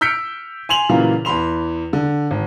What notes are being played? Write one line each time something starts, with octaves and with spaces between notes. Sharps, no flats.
E6 F6 G6 B6 C#7 D7
G#5 C6 F7 F#7
A#2 C#3 E3 F#3 A#3 F4
E2 E3 B5 C6 F7
D3
G#1